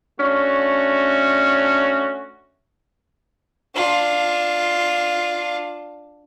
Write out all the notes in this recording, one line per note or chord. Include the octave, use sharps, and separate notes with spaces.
A3 C#4 D4 F#4
D4 F4